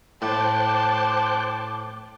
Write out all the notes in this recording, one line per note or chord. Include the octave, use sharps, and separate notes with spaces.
A2 C5 G5 A5 C6 D6 F#6